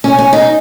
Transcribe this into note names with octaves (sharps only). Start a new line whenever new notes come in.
C#4
C#4
D#4